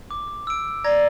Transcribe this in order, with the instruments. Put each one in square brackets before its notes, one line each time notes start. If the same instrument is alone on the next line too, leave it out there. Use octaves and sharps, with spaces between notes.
[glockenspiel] D6
E6 D7
[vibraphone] D5 [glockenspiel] A#5 G#6 A#6